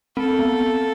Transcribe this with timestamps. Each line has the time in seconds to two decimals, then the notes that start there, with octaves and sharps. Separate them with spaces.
0.17 C4 A4
0.39 B3